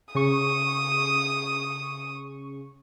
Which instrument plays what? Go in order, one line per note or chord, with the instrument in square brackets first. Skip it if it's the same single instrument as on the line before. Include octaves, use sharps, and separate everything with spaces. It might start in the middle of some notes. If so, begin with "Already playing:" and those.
[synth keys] C#3 C#6 [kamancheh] D#6